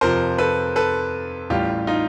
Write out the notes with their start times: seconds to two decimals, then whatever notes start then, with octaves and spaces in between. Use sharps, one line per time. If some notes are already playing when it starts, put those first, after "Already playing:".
0.01 F2 C3 F3 A#4 C5
0.38 A4 B4
0.76 A4 B4
1.50 A1 A2 E3 G3 F4 G4
1.87 D#4 F4